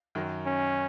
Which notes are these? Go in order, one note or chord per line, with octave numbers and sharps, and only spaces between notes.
F#2 D#3 F#3
C#4